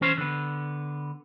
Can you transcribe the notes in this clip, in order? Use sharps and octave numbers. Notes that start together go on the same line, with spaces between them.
E3 C#4 C5 C#5
D3 B3